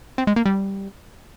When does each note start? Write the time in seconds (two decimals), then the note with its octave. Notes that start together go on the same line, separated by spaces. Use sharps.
0.18 C4
0.27 G#3
0.36 A#3
0.46 G3